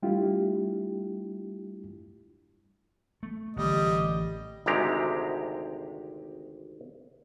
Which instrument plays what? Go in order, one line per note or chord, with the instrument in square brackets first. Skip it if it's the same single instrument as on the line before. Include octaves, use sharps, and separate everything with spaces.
[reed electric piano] G3 A3 D4 E4 F4 G4
[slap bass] A3
[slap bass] A1 D3 [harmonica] G3 D#5
[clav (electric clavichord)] G#1 D2 C3 G#3 G4 A#5